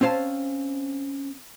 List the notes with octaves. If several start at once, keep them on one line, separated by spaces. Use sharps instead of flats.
C4 C#4 C5 F5 A5